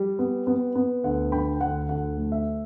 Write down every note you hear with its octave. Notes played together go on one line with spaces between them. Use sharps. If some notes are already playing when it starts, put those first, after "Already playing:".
Already playing: G3
B3
B3
B3
D2 F#5
D3 G5 B5
D2 F#5
D2 F#5
A3
E5